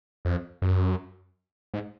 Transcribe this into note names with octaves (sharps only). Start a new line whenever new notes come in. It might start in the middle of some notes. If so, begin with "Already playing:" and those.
F2
F#2
G#2